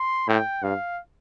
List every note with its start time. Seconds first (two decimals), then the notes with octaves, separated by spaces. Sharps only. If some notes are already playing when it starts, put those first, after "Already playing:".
Already playing: C6
0.28 A2 G5
0.63 G2 F5